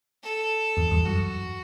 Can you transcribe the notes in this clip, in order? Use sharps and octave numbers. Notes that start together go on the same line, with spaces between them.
A4
E2 G2
E2 G2
F#2 F#4